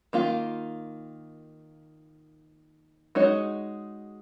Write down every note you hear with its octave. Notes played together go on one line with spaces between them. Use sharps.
D#3 A#3 F4
G#3 D#4 F#4 C#5